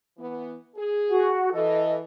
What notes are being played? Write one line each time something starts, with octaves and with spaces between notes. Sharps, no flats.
E3 B3
G#4
F#4 F#5
E3 A4 D#5